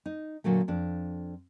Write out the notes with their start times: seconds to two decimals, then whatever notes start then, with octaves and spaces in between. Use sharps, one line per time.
0.06 D#4
0.44 A#2 D3 F#3 A3
0.68 F2 D4